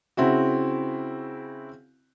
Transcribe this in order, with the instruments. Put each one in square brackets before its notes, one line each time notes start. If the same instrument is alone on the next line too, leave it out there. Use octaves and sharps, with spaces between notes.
[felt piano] C#3 C4 E4 F#4